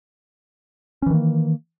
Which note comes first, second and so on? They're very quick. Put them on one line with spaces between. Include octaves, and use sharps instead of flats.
C#4 E3 D#3 A#3